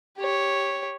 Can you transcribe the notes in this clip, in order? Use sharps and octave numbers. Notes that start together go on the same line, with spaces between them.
G4 C#5